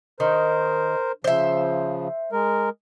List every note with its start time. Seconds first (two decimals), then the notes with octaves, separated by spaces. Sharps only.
0.20 D#3 A#4 C5
1.24 C#3 F3 C5 E5
2.32 G#3 A#4